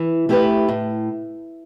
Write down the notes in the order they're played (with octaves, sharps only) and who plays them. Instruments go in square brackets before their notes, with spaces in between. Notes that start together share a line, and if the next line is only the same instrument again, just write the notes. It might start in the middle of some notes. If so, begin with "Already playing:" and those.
Already playing: [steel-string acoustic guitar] E3
A3 E4 G4 B4
A2